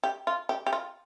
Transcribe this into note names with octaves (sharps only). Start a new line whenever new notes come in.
G4
F4
G4
G4
F4